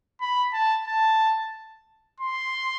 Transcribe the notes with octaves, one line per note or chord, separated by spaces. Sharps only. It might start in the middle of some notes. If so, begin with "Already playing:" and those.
B5
A5
A5
C6